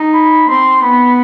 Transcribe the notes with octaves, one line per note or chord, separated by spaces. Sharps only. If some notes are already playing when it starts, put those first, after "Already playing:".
Already playing: D#4
B5
C4 C6
B3 B5